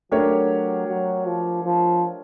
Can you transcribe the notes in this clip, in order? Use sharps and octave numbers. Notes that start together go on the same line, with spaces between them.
F#3 A3 D4 G4 A#4 C#5
F#3
F3
F3